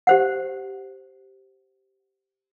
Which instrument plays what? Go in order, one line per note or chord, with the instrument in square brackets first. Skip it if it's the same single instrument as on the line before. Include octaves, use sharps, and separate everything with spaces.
[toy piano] G4 C5 F#5